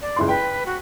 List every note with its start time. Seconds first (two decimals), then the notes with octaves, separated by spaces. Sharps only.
0.01 D5
0.16 C#2 E4 C6
0.28 B4 G5
0.66 F#4